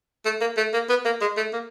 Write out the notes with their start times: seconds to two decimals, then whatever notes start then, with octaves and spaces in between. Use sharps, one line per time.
0.25 A3
0.41 A#3
0.57 A3
0.73 A#3
0.89 B3
1.05 A#3
1.21 G#3
1.37 A3
1.53 A#3